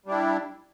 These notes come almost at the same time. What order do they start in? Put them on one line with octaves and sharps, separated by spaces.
G3 D4 E4